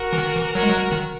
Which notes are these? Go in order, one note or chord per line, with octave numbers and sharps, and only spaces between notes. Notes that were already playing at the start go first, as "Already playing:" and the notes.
Already playing: F#4 A#4
E3
D#3
E3
F#3 F#4 A#4
G#3
F#3
D#3